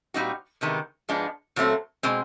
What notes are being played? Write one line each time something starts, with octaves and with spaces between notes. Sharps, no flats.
A#2 G3 C4 D#4 F#4
E2 C3 D#3 G#3 B3
G#2 F3 G#3 B3 D4
A#2 F#3 A3 C4
B2 G#3 C4